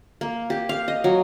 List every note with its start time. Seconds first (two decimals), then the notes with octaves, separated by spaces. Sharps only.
0.21 A#3
0.50 G4
0.69 F5
0.88 D#5
1.04 F#3